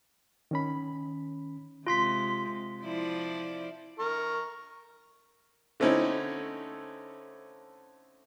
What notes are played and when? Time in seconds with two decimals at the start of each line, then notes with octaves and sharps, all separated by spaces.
0.51 D#3 C#4 B5
1.87 C3 G#3 F4 C6 B6
2.83 F3 E4 D5
3.99 A#4 C#6
5.80 D3 A3 C4 C#4 D#4 E4